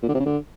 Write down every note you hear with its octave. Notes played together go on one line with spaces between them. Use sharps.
A#2
D3
C3
C#3
D3